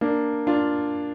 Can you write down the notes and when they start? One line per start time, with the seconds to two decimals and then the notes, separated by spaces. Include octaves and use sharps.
0.01 A#3 D4
0.47 D4 F4